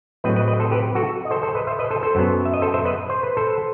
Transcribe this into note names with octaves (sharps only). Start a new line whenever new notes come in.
A2 F#3 C4 B4 D#5
B4 D#5
B4 D#5
A4 C5
G4 B4
F#4 A4
D#5
A4 C5
A4 C5
B4 D#5
C5 E5
B4 D#5
A4 C5
A4 C5
F#2 F#3 B3
E5
D#5
A4 C5
C5 E5
B4 D#5
C5
B4
A4 C5